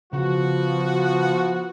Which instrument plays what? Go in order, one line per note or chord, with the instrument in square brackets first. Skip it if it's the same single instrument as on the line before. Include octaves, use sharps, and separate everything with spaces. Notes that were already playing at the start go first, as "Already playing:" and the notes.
[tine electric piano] C#3 [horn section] F3 B3 F#4